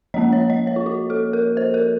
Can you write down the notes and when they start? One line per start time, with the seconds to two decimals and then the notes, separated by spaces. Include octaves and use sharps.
0.14 F3 A#3 C#4 D#5
0.32 C#5
0.50 D#5
0.67 C#5
0.76 F4
0.86 F#4
1.10 A4
1.33 A#4
1.57 C5
1.74 A#4